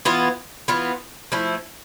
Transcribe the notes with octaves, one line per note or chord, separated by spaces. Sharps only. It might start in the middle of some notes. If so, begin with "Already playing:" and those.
E3 B3 F4
E3 B3 F4
F3 A3 E4